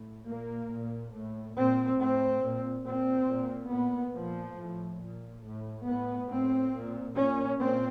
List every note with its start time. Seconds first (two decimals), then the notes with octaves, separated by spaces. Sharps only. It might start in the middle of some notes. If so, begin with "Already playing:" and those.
Already playing: A2
0.27 A#2 A#3
0.71 A#2
1.14 A2
1.57 A#2 C4
2.00 A2 C4
2.43 A#2
2.86 A#2 C4
3.29 A#2
3.72 A#2 B3
4.15 A#2 F3
4.58 A2
5.02 A#2
5.44 A2
5.87 A2 B3
6.31 A2 C4
6.74 A#2
7.16 A#2 C#4
7.59 A#2 C4